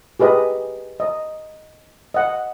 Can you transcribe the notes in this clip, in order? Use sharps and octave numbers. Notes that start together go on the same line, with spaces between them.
G4 G#4 B4 D#5
D#5
D#5 F#5